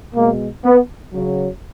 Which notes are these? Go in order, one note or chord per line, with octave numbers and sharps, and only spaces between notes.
B2 G#3 A#3
B3
C#3 F#3